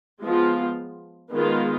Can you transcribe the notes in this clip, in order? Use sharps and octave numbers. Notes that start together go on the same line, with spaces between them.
F3 G#3 B3 F4
D#3 G#3 B3 F4